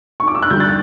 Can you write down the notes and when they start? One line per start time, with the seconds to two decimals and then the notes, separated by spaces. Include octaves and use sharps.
0.20 C#6
0.28 D6
0.35 E6
0.42 F#6
0.50 D3 G3 G6
0.60 A6